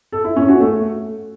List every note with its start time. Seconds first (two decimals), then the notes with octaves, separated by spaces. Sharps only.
0.12 A4
0.24 E4
0.36 C#4
0.48 F#4
0.60 A3